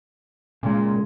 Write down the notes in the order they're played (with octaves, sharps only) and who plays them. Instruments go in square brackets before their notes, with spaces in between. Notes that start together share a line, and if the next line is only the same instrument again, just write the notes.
[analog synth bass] A#2 [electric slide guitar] C#3 G#3